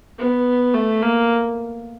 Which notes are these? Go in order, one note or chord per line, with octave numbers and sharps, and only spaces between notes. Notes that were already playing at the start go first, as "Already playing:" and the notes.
B3
A3
A#3